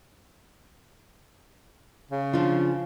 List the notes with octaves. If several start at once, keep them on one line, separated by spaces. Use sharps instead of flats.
C#3
F3 D4 F4